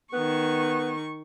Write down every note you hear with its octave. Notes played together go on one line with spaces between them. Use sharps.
D#3 B3 C#6